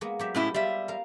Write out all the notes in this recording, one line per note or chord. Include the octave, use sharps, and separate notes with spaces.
G#3 A#3 B3
F#3 G4 E5
A2 C#4 E4
G3 F4 E5
A#4 F5